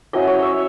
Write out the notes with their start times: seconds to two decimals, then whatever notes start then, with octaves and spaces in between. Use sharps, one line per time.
0.13 F#3 C#4 E4 D#5
0.28 C#5
0.42 E5